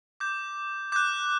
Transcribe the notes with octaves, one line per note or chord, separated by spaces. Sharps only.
D6 G6
D6 F#6 G6